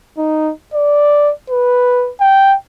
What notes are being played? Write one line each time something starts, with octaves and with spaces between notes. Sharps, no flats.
D#4
D5
B4
G5